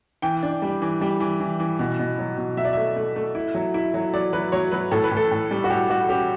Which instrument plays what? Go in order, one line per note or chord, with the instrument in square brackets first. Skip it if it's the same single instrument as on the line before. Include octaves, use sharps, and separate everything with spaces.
[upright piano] E3 G5
D4
G3
E3
G3
E3
E3
E3
B2
B2
F#3
B2
F#3 E5
D5
A3 E5
A3
A3
E4
F#3
E4
F#3
F#3 D5
F#3 B4
F#3 C#5
F#3 B4
A2 A4
B4
A2
A4
A2
G3
F#4
A2 G4
G3 F#4
C#4 G4